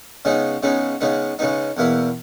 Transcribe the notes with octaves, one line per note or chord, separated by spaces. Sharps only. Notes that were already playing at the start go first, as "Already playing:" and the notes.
C#3 G#3 B3 D#4
C#3 G#3 B3 D#4
C#3 G#3 B3 D#4
C#3 G#3 B3 D#4
E2 B2 A#3 E4